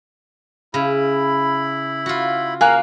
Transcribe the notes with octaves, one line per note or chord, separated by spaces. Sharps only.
C#3 E4 B5
F4 F#4
A#3 A#4 F5 G#5 F#6